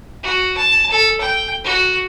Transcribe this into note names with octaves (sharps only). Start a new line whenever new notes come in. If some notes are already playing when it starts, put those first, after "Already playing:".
F#4
A5
A4
G5
F#4